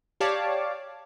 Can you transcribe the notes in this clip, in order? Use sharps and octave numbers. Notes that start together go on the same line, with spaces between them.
G4 C#5 D5 F5 A5 D6